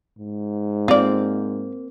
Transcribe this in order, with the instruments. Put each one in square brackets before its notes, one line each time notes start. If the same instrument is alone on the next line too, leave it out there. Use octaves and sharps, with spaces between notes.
[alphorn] G#2
[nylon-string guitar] A#3 C4 [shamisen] F4 D5